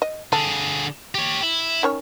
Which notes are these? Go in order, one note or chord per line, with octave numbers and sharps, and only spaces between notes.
D#5
D3 G#4 A4
G4 C#5
E4
D#3 C#4 C#5